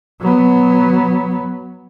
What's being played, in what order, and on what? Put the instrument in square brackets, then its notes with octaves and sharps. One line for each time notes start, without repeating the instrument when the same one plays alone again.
[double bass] F#3 B3